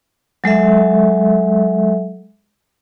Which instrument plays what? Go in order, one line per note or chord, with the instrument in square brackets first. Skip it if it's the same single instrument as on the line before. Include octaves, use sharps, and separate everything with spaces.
[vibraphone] F#3 G#3 A4 E5